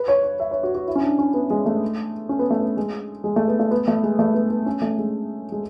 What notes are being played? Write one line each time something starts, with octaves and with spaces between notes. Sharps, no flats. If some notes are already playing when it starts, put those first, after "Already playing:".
Already playing: B4
C#5
C#5
E5
C#5
F#4
F#4
E4
C#4
D4
C#4
B3
G#3
A3
C#4
B3
A3
B3
G#3
G#3
A3
B3
A3
B3
A3
G#3
A3
B3
B3
C#4
A3
G#3
G#3